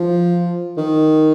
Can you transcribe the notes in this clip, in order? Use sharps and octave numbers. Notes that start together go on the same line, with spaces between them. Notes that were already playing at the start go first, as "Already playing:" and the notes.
Already playing: F3
D#3